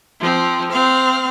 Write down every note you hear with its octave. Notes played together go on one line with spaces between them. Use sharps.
F3 C4
C4 F5